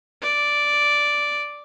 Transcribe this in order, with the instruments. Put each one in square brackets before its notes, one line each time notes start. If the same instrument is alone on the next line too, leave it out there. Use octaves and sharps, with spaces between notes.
[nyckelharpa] D5